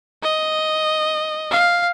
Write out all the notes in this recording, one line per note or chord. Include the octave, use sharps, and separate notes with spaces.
D#5
F5